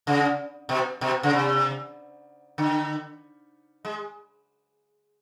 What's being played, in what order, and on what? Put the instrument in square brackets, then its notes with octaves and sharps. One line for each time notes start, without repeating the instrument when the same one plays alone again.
[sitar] C#3
B2
B2
C#3
C3
D3
G#3